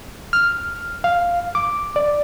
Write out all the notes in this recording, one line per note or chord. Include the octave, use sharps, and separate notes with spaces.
F6
F5
D6
D5